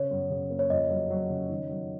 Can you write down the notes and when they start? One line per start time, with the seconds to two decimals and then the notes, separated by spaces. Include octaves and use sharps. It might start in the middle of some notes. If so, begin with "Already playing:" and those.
Already playing: C#3 C#5
0.11 F#2
0.30 C#3
0.50 A#3
0.59 C#5
0.70 F2 D#5
0.90 F#3
1.10 F#3
1.30 C#3
1.50 D#3
1.69 F#3